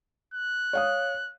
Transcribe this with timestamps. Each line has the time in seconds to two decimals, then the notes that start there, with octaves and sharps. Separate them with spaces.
0.34 F#6
0.73 C#5 F5 D#6